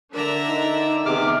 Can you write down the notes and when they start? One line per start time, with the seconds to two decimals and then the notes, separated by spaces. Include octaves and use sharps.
0.14 D3 D4 A#4 D5 E5 A#5
0.48 D#4
1.06 C3 D#3 E3 B3 G#4 D6 F6